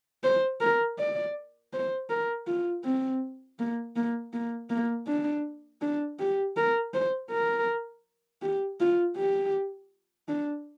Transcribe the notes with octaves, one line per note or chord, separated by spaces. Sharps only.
C5
A#4
D5
C5
A#4
F4
C4
A#3
A#3
A#3
A#3
D4
D4
G4
A#4
C5
A#4
G4
F4
G4
D4